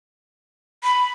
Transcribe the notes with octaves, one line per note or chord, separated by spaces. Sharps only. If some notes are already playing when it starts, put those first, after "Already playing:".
B5